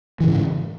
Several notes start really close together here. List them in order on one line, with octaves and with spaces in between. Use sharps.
E3 C#3 G#2